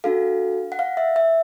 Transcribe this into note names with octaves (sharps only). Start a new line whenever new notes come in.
D4 F#4 A4 F5
F#5
F5
E5
E5